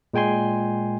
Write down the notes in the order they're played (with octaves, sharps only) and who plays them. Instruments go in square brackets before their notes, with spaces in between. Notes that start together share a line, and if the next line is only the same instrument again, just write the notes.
[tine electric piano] A#2 G#3 G5 G#5 C6